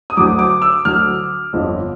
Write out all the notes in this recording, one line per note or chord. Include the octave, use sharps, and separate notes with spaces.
D#6
D2 D3 F#3 D6
D6
E6
D2 D3 F#3 F6
G1 F2 D3 F3